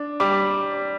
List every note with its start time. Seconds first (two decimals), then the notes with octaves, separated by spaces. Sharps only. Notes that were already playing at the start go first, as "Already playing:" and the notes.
Already playing: D4
0.20 G3 D6